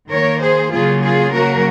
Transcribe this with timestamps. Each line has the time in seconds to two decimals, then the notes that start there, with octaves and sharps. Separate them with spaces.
0.08 D#3 A#3 A#4 C#5
0.39 G#4 C5
0.71 C#3 F#3 A#3 F4 G#4
1.02 F4 G#4
1.33 C#3 F#3 A#3 F#4 A#4